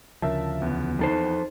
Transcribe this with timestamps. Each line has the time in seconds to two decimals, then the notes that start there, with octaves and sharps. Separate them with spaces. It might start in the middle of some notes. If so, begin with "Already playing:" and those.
0.22 D2 C#3 F3 A#4 E5 A5
0.62 E2 B3
0.99 F2 D#4 A4 C5